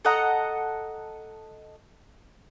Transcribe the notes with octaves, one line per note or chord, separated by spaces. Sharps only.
A4 D#5 F#5 A#5